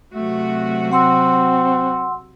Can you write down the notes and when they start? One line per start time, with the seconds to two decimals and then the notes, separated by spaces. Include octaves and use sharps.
0.14 C3 F#3 A3 F#4
0.91 C4 F#5 C6 E6